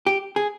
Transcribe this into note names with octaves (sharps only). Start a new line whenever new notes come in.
G4
G#4